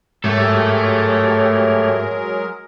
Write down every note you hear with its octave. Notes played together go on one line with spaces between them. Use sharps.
G#2 F#3 G#3 A3 G4 A4 A#4 C#5